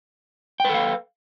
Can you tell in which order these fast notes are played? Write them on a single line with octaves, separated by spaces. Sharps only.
G5 B4 A4 F5